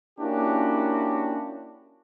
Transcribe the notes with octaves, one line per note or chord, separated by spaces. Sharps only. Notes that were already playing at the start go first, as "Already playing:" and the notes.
A#3 C#4 D4 E4 F#4 G4